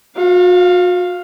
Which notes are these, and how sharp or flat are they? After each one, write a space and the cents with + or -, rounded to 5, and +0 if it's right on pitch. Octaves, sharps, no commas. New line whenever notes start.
F#4 -45 F5 +0